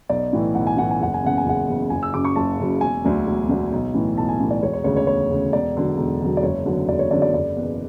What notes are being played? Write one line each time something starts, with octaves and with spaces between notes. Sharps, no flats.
B1 D5
A2 E3
B1 F#5
G#5
A2 E3 F#5
G#5
F#1 F#5
G#5
E2 C#3 F#5
G#5
F#1 F#5
E2 C#3
F#1 G#5
E6
F#2 C#3 F#3 D6
C#6
F#1 A5
F#2 C#3 F#3
E1 G#5
D2 D3 F#3
E1
D2 D3 F#3
B1
A2 E3
B1 A5
G#5
A2 E3
D5
E1 C#5
C#5
D2 C#3 C#5
C#5
E1 C#5
D2 C#3
E1 D5
E2 D3 F#3
E1
E2 D3 F#3
D5
F#1 C#5
E2 D3 F#3
F#1 D5
C#5
E2 D3 F#3 D5
D5
F#1 D5
E2 B2